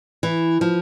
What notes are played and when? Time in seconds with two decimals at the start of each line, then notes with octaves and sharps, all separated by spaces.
0.23 E3
0.61 F3